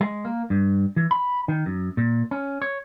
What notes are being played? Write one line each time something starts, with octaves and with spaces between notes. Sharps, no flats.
G#3
A#3
G2
E3
B5
D#3
F#2
A#2
C#4
C#5